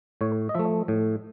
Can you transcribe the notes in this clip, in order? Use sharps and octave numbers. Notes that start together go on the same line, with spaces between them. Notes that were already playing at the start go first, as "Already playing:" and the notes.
A2 C#5
D#5
F3 A3 E5
A2